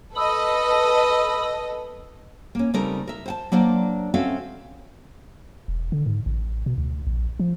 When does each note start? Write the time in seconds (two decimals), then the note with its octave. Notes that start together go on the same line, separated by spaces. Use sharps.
0.16 A4 B4 D#5 B5 D#6 E6
2.55 A#3 C#4
2.74 C#3 G3 A3 C4 D#4 A#4
3.07 A#4 E5
3.26 C5 F#5 A5
3.52 F#3 A#3 D4 C5 D5
4.14 C4 C#4 F#4 A4 E5 F5
5.68 E1
5.92 D3
6.06 G#2
6.26 A1
6.66 B2
6.78 D2
7.07 A#1
7.40 F3